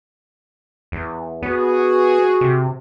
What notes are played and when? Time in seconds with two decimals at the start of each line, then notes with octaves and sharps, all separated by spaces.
0.92 E2
1.43 B3 F#4 G#4
2.41 C3